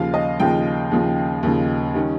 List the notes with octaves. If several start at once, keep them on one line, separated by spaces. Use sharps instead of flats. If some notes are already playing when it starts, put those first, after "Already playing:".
Already playing: D#2 C#3 F3 F5
D#5
D#2 C#3 F3 G5
D#2 C#3 F3
D#2 C#3 F3
D#3 G3 C#4